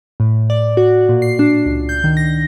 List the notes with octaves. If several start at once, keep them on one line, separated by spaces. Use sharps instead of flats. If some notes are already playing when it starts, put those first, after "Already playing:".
A2
D5
F#4
A#2
C7
D4
C#2
G6
D#3
A#6